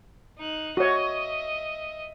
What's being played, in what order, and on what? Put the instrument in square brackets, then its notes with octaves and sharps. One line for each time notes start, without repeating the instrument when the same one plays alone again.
[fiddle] D#4 F#6
[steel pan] F#4 C#5 [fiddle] D#5 E5